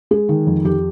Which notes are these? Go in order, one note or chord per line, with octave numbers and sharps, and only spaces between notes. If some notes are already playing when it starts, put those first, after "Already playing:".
G#3 G#4
D#3
F2
F2 G4